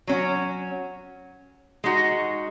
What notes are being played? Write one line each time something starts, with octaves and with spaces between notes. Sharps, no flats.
F#3 C#4 F#4
G#3 D#4 F#4